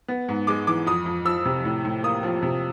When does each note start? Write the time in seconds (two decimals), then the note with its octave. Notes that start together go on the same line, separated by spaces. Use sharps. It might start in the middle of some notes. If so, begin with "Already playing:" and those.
0.08 B3
0.28 G#2
0.47 G#3 D6
0.67 E3 D6
0.86 F2 D#6
1.06 F2
1.25 F3 E6
1.45 C3
1.65 A2
1.85 A2
2.03 A#3 D#6
2.23 F3
2.42 C3